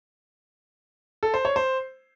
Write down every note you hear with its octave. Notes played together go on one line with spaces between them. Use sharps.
A4
C5
C#5
C5